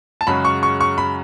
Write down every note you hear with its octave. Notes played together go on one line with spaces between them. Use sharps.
A5
F#2 C#3 G#3 C#4 F#4 B5
C#6
C#6
C#6
B5